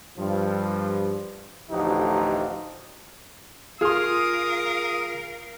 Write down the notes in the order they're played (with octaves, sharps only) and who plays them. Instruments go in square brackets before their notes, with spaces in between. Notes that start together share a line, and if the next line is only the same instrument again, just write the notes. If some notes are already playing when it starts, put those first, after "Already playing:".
[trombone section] G2 F3
A1 D2 F3 D#4 F#4 G4
[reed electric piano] F4 F6 [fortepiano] G#4 C6 [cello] A#4 F5 [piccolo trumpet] D#6